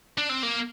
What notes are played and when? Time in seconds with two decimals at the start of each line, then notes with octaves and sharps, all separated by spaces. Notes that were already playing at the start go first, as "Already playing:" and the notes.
0.18 D4
0.30 C4
0.43 A#3